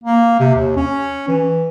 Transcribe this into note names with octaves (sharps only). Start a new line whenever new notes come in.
A#3
C3
D#2
C#4
E3